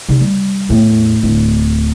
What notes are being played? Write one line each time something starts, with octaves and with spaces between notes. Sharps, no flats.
C3 D#4
G3
E2 A2
D1